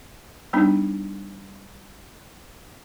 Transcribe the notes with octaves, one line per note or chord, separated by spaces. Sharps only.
G3 B3 D4 D#4